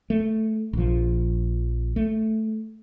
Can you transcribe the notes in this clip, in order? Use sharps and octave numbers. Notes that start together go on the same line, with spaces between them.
A3
A#1 F3
A3